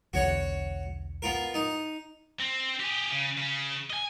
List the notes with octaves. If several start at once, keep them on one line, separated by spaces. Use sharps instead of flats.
B1 E2 D3 F#4 C#5 F#5
B3 F4 A#4
D#4 D#6
C4
G4 G#4
C#3
C#3
D#5 G#5